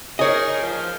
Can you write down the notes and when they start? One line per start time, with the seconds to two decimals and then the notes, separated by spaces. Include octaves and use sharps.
0.19 D#4 G#4 A#4 C#5 D#5
0.61 F3